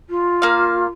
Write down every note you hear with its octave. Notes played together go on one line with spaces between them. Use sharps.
F4
A#3 F5